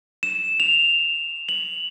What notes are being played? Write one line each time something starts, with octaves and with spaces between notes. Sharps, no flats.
E7
F7
F#7